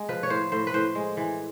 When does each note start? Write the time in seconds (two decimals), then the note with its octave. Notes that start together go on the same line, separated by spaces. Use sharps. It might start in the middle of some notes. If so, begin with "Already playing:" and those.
Already playing: G#3
0.09 F3 B4
0.23 C#5
0.30 A2 C5
0.52 A2 C5
0.67 B4
0.74 A2 C5
0.95 G#3
1.17 E3